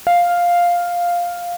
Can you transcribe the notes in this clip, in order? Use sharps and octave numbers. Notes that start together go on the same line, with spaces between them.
F5